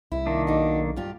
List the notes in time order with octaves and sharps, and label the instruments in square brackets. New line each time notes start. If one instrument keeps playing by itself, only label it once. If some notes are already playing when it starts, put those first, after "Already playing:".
[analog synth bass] C2 [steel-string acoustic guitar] E4
[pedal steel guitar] D#3 A#3 D4
[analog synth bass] B1 [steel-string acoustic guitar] D#4 F#4
[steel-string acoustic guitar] G2 F4 G4